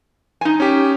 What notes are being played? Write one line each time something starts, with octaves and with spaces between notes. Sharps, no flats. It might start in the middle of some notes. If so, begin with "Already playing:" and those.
D#4 G#5
C#4 G4